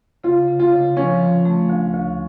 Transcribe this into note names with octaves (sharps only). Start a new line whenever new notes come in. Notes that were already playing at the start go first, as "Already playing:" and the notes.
C#3 F4
C#3
F4
C#3
F3 C#4
F3
A3
D2
D2